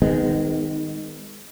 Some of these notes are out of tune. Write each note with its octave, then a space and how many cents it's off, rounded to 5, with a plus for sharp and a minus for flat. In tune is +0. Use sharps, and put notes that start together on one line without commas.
D#3 +0 G#3 -20 B3 +40